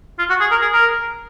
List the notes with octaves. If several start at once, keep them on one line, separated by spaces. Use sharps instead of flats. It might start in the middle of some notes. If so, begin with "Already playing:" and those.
F4
F#4
G#4
A#4
G#4
A#4